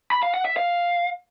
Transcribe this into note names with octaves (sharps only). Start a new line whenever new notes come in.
B5
F5
F#5
E5
F5